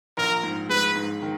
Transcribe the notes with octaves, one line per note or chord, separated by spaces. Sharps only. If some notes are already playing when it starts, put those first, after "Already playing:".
A#1 A#4
G#2
G#3 B4
G#2
D#3